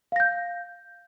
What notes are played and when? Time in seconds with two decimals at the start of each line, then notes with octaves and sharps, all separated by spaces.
0.12 F5
0.16 A#6
0.20 G6